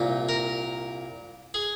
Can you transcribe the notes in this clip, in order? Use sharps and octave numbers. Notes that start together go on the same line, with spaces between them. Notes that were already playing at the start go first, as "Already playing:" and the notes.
Already playing: C2 A#2
A#4
G#4